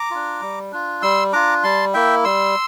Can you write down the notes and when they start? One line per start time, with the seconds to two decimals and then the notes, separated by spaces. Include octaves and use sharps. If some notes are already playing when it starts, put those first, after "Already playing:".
Already playing: A#5 D6
0.11 D4 F4
0.41 G3
0.72 D4 F4
1.02 G3 C6 E6
1.33 D4 F4 A#5 D6
1.63 G3 A5 C6
1.94 A#3 E4 E5 G5
2.24 G3 C6 E6